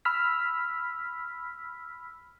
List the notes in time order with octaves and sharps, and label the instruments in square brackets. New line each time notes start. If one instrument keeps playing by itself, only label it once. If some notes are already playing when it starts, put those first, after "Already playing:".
[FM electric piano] B5 E6 F6 B6